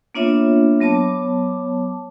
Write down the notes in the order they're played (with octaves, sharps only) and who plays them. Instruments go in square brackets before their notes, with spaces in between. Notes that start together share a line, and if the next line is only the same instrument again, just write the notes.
[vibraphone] A#3 B3 D4 F4 C#5 E5
F#3 B3 C#5 A5 D6